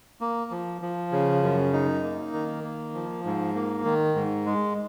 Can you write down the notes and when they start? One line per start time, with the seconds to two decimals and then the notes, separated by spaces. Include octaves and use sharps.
0.21 A#3
0.51 F3
0.81 F3
1.12 C#3
1.42 F#2
1.73 D#4
2.03 A#3
2.33 D#3
2.64 A#3
2.94 F3
3.25 G#2
3.55 A#3
3.85 D#3
4.15 G#2
4.46 G#3